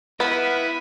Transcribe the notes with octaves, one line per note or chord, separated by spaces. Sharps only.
B3 E4 B4 F5 F#5 B5 B6 D#7